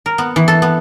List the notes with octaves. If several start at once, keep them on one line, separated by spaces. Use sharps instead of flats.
A#4
B3
E3
A4
B3